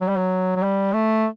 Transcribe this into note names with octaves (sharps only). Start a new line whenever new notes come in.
F#3
G3
F#3
F#3
G3
A3